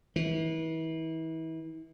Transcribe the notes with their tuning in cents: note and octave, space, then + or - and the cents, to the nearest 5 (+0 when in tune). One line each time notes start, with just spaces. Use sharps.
E3 -35